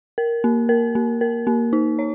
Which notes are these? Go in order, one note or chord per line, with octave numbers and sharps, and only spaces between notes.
A#4
A#3
A#4
A#3
A#4
A#3
D#4
C#5